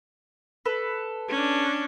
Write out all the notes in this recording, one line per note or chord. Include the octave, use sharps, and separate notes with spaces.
A4 B4
C#4 D4